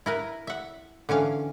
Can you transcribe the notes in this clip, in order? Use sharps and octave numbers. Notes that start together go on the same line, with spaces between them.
E4 A#4 B4
E5 F#5
D3 E3 C#4 F5